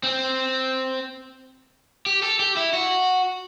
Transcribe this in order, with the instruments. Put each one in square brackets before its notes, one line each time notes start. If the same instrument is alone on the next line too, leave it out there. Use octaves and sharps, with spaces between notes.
[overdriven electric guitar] C4
G4
A4
G4
E4
F#4